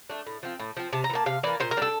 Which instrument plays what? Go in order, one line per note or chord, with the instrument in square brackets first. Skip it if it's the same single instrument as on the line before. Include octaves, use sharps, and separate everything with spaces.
[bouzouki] A3 D4
A2
F3 C4
A2
F3 C4
C3 A5
A#5
E3
A#3 A5
C3 F5
E3 A#3 D5
A#2 C5
A#4
G3 D4 A4